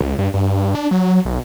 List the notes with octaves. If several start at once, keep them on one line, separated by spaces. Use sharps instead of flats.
C#2
G2
G2
D4
F#3
B1